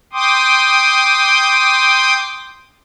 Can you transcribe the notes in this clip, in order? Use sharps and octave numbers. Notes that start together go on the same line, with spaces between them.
G5 C6 D6 D#6